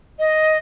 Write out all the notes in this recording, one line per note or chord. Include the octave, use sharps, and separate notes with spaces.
D#5